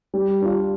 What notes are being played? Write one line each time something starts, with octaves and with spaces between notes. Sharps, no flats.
G3
D4 F4